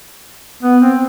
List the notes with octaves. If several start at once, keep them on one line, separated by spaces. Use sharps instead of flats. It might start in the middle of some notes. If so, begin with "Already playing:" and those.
B3
C4